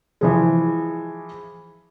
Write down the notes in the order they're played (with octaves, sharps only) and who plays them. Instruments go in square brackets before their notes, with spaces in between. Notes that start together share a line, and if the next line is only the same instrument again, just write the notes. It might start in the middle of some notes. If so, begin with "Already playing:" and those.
[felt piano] E3 F3 G#3